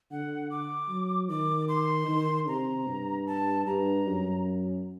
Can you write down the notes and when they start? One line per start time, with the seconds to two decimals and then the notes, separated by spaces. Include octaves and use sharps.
0.11 D3 F#5
0.51 D6
0.89 F#3
1.29 D#3 D6
1.68 C6
2.08 D#3
2.48 C3 A#5
2.87 G2
3.27 A5
3.66 G2 A#5
4.06 F#2